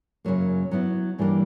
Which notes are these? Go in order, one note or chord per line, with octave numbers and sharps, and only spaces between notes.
F#2 C#3 F#3 A#3
F#3 B3 E4
G2 E3 G3 A#3 D4